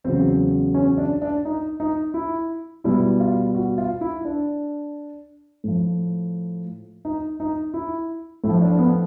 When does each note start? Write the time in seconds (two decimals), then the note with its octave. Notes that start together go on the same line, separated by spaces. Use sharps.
0.04 E2 C#3 F#3 C4
0.75 C#4
0.98 D4
1.22 D4
1.45 D#4
1.80 D#4
2.14 E4
2.84 B2 G3 E4
3.20 F4
3.55 F#4
3.78 F4
4.01 E4
4.25 D4
5.64 A2 F3
7.05 D#4
7.40 D#4
7.74 E4
8.44 A2 E4
8.49 F3
8.61 D4
8.79 B3